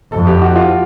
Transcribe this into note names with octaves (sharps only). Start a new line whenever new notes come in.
F2 A4
G4
F#4
F4